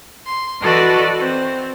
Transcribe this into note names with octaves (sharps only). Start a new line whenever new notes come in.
C6
E3 F#4 A4 B4 D5 D#5
C4